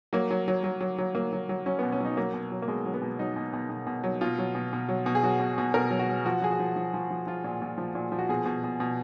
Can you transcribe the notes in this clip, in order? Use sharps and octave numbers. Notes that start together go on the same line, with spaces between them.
F#3 A#3
F#3
F#3
F#3
F#3
F#3
F#3 A#3
F#3
F#3
F#3 C#4
B2 B3
C#4
F#3 D#4
F#3 A#3
B2
F#3
A#3
B2 G#3
F#3
B3
B2
F#3 D#4
B2
B2
B2
B2
F#3
B2 F4
F#3
B2
B2
F#3
B2
G#4
F#3 F#4
B2
B2
B2 A#4
F#3
F#4
F#3
F3 F#4
F3 G#4
F#4
F3
F3
F3
F3
F3 F4
A#2
A#2
F3
A#2
F3
F#4
B2 G#4
B2
B2
B2